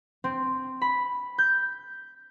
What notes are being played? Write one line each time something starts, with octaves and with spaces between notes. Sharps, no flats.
C4
B5
G6